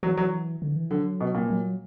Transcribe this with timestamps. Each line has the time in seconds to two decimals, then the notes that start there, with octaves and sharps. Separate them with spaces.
0.03 E3 F#3
0.17 F#3
0.62 D3
0.76 E3
0.91 D3 F#3
1.21 B2
1.35 A#2
1.50 F#3